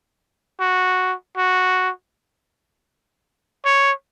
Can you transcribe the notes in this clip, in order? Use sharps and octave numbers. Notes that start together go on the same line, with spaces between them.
F#4
F#4
C#5